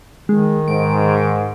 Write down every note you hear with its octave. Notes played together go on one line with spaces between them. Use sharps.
D#3 G#3
G#2 D7